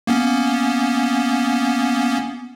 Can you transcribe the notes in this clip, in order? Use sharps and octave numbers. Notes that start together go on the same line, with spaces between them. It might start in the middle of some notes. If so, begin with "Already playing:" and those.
A#3 B3 C#4